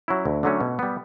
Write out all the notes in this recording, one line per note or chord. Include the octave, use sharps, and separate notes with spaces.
F#3 C#4 E4
D2
D3 F#3 A3 C#4
B2
G3 B3